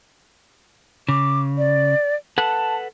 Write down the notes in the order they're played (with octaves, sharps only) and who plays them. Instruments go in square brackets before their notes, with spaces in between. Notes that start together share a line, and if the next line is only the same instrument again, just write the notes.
[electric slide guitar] C#3 [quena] D6
[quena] D5
[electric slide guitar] A4 B4 F#5 [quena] A5